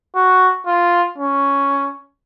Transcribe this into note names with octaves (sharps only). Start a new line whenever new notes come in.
F#4
F4
C#4